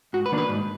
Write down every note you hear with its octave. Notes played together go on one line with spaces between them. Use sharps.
G#2 F#4
B4
D#3 A#3 D4
B4
G#2